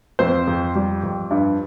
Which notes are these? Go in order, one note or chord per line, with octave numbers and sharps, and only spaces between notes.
F2 C4 C5
F2
G3
F2
G2